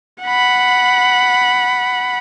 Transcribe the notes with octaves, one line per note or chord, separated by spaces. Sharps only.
F#5 B5